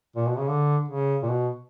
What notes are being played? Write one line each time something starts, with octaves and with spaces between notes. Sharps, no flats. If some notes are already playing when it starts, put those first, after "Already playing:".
A#2
B2
C#3
D3
C#3
A#2
B2